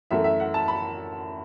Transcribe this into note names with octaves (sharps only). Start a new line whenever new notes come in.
F#2 E3 A3 E5
E5
F#5
A5
B5